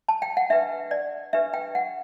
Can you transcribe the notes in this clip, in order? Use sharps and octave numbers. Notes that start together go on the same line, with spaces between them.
A5
G5
F#5
D4 G4 B4 E5
D5
D4 G4 B4 E5
G5
F#5